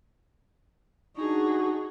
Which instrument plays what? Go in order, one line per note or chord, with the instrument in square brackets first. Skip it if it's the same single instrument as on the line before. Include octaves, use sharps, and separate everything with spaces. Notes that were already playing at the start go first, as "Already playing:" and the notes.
[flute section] D4 F#4 C#6 [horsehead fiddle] D#4 G#4